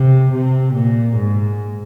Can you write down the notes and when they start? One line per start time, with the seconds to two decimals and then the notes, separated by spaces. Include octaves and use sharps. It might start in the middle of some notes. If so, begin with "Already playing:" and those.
Already playing: C3
0.32 C3
0.74 A#2
1.17 G#2